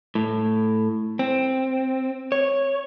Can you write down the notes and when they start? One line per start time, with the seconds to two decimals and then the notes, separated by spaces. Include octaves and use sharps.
0.15 A2
1.19 C4
2.32 C#5